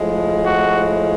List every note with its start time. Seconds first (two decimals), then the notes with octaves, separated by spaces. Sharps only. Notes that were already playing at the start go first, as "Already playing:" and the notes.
Already playing: A2 F3 G#3
0.45 F#4